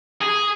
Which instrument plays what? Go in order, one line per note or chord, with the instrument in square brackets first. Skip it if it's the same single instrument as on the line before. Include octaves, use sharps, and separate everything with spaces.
[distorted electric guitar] G#4